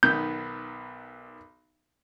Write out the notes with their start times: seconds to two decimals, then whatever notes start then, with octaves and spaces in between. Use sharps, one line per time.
0.03 B1 D#3 B3 G6